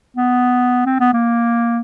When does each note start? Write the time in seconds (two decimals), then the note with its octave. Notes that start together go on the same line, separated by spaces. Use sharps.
0.17 B3
0.86 C4
1.00 B3
1.14 A#3